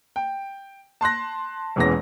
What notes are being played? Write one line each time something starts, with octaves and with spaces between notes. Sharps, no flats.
G5
A5 C6 F#6 A#6
E1 E2 E3 G#3 C#4 A#6